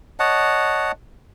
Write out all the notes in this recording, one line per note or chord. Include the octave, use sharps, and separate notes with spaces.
C#5 D#5 F#5 A5